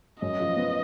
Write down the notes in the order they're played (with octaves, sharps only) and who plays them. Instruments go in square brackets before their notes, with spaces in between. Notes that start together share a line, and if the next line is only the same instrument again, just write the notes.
[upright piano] F#2 [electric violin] D#5
[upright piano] F3
B3